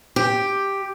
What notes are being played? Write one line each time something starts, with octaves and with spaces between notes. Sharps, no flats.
G4